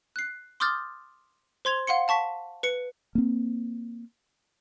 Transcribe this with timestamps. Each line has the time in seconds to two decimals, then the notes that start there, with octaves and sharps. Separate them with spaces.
0.16 F#6 C7
0.60 C6 D6 D#6 F6 G6 A6
1.65 C5 C6 G#6 F7
1.87 F5 F#5 C6 C#7
2.08 F5 A5 C#6 B6
2.63 B4 C#7
3.15 A#3 C4